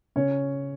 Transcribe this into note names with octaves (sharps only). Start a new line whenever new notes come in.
C#3 C#4 C#5